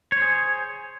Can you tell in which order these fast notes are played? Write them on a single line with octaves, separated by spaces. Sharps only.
C#5 C5 G#4